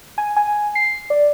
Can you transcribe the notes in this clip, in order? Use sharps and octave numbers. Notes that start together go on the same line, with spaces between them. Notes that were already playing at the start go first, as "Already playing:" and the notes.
G#5
G#5
C7
D5